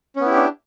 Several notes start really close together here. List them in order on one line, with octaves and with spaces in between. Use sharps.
C#4 B3 E4 G4 D4